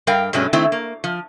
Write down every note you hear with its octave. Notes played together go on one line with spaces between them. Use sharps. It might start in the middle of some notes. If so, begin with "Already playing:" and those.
G2 G3 A#4 F5 G5
G2 B2 F#3 G#3 A3 C#4
D#3 A3 C4 E4
A#3
F3